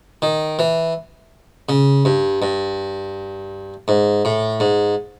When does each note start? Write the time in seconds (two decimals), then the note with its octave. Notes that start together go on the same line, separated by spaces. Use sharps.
0.22 D#3
0.59 E3
1.69 C#3
2.05 G2
2.42 G2
3.88 G#2
4.25 A2
4.60 G#2